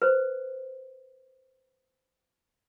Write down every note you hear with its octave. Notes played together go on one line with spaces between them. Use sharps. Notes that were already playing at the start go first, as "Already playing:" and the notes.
B4 C5